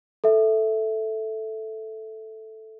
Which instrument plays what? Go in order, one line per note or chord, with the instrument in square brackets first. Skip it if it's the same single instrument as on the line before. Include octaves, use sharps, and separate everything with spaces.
[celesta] A4 E5